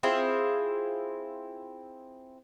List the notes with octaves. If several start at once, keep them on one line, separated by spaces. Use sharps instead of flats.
C4 E4 F4 G#4